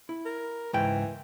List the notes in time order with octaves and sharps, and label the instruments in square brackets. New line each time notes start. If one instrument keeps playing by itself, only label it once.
[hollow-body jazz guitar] E4
[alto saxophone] A#4
[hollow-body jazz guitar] C#2 G#2 G5 [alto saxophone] E3